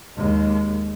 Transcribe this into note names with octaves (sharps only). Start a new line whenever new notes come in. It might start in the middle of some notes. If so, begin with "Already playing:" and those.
D#2 G#3